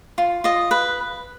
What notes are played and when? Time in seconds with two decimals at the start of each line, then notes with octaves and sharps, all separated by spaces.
0.18 F4
0.44 F4 D#5
0.71 B4